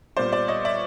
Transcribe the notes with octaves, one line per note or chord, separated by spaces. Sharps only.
A#2 G3 B3 C5 D5
C5 D5
C#5 D#5
D5 E5